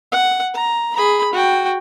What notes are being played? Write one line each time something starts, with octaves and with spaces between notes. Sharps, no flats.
F#5
A#5
G#4 B5
F#4 G5